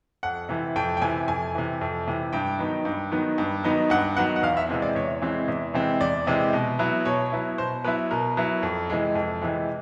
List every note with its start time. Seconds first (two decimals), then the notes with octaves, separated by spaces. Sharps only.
0.23 F2 F#5
0.49 C3 E3
0.76 F2 G5
0.97 G5
1.01 C3 E3 G#5
1.28 F2 G#5
1.55 C3 E3
1.81 F2
2.07 C3 E3
2.33 G2 G5
2.59 D#3 F#3 B3 D#4
2.85 G2
3.11 D#3 F#3 B3 D#4
3.38 G2
3.64 D#3 F#3 B3 D#4
3.90 G2 F#5
4.17 D#3 F#3 B3 D#4 F#5
4.36 F#5
4.42 E2 F5
4.57 E5
4.69 C3 E3 G#3 C4
4.82 D5
4.95 E2 C#5
5.22 C3 E3 G#3 C4
5.48 E2
5.74 C3 E3 G#3 C4
6.01 E2 D5
6.27 C3 E3 G#3 C4
6.53 B2
6.79 F#3 B3 E4
7.05 B2 C#5
7.32 F#3 B3 E4
7.58 B2 C5
7.84 F#3 B3 E4 B4
8.11 B2 A#4
8.37 F#3 B3 E4
8.63 F2
8.90 C3 E3 G#3
9.15 F2
9.41 C3 E3 G#3